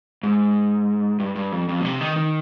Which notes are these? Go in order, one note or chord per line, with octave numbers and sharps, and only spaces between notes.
G#2
G2
G2
F2
F2
A#2
C3
D#3
D#3